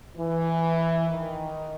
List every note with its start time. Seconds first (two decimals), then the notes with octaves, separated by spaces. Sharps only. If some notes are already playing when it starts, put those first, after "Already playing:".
0.16 E3
1.08 D#3